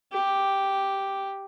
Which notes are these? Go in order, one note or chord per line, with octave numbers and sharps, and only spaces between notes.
G4